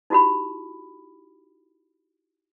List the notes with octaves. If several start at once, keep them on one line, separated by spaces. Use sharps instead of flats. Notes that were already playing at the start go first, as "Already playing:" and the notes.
D#4 E4 F#4 G4 B5